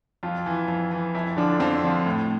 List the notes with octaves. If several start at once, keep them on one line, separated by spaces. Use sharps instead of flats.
F2 F4
E3
F2
E3
F2 E4
D3 F3 D4
F2 C4
D3 F3
A2